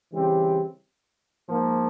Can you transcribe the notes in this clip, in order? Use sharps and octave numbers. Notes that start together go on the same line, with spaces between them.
C#3 E3 G3 C4 G4
G#2 F3 A#3